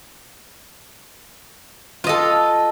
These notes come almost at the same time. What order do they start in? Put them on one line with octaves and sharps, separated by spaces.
F4 D#5 A4